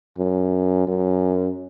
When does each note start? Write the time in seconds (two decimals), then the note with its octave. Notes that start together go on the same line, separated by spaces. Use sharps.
0.18 F#2
0.87 F#2